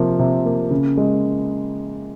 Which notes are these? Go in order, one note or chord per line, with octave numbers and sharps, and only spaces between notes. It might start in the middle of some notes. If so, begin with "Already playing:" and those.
Already playing: C3 F3 A#3
C3
A#3
C#3
G#3